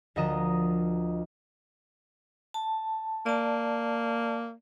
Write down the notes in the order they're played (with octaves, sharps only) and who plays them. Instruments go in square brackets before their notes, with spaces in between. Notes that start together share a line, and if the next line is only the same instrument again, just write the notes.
[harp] D2 F3 A#4 D#5 A#5 E7
[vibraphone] A5
[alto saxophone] A#3 [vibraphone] D5 A5